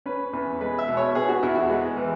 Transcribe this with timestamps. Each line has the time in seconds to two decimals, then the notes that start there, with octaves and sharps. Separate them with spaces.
0.06 C#4 B4
0.33 E2 B4
0.61 G#3 B4
0.79 E5
0.88 B2
0.97 C#5
1.15 B3 G#4
1.29 F#4
1.43 E2 E4
1.56 F#4
1.70 G#3
1.97 E3